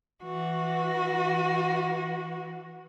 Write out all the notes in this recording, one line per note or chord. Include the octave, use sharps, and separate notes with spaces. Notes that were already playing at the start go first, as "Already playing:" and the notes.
E3 F#4